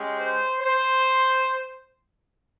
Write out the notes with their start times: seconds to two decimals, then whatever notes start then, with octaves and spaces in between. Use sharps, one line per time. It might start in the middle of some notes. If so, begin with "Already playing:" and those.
Already playing: G#3 C#4 G4
0.17 C5
0.61 C5